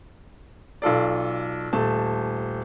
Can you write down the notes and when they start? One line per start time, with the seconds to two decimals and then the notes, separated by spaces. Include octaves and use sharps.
0.82 B1 F4 A4 D5
1.73 D#1 A3 A5